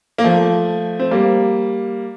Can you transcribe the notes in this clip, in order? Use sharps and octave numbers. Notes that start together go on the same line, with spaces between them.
A#3
F3 A3
C4
G3 A#3